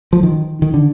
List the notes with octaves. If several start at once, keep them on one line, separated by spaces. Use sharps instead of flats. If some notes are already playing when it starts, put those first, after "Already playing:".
F3
D#3
D#3
D3